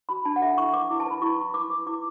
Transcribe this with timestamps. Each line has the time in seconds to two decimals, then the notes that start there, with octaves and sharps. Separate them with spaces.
0.09 F#4 B5
0.25 D4 A5
0.36 F#5
0.42 A4 E5
0.47 F#5
0.58 E4 C#6
0.73 B4 D6
0.90 E4
1.00 A5
1.06 B4 B5
1.21 E4 C#6
1.39 E4
1.54 B4 D6
1.70 B4
1.86 E4 D6